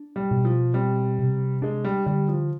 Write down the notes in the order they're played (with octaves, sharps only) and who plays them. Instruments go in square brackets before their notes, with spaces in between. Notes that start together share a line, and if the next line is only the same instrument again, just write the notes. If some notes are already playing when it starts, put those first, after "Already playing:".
Already playing: [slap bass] D4
[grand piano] G3
[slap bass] B2
[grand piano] F3
[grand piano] G3 [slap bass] C4
[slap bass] C3
[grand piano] G#3 [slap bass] D4
[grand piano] G3
[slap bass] D3 [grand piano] G3
[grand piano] F3